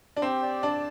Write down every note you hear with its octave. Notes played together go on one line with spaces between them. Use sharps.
D4
C4 G4
D5
D4 A5